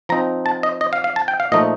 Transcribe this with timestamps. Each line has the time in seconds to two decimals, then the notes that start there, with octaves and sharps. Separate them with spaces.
0.09 F3 C4 D#4 A#5
0.46 A5
0.63 D#5
0.81 D#5
0.93 F5
1.04 F5
1.16 A5
1.28 G5
1.40 F5
1.52 A#2 F3 A3 D#4 D#5